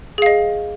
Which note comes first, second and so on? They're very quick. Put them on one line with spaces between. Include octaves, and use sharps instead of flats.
G#4 F5 D#5